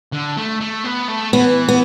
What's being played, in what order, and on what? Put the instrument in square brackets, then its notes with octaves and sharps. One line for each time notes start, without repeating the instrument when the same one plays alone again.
[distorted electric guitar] D3
A3
A3
B3
A3
[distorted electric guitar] E3 [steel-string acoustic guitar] B3
[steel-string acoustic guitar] B3